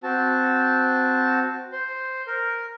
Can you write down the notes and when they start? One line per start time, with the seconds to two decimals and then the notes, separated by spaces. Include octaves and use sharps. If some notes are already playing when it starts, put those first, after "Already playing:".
0.03 C4 F#4 A5
1.72 C5
2.27 A#4